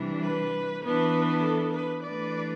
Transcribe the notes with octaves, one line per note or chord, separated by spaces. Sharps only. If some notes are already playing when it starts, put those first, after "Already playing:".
Already playing: C3 E3 G3 D4
B4
E3 B3 D4 B4
A4
B4
E3 A3 D4 B4 D5